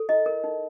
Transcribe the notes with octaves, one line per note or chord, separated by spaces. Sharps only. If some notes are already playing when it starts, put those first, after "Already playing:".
Already playing: A4
E4 D#5
A#4
D#4